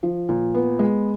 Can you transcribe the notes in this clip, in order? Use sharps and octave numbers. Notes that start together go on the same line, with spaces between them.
F3
A#2
B3
G#3